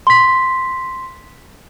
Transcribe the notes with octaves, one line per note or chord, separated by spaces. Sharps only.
C6 B6